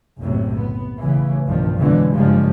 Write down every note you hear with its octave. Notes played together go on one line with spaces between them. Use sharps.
F#1 B1 A2 C3 F#3
B3
A1 C#3 E3
B1 G2 D#3 F3
F2 B2 D3 E3 F#3 G#3
F#1 G2 C#3 F3 G3 G#3